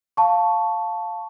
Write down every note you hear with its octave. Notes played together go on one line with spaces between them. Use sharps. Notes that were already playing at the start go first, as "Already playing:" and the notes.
F5 A5 C#6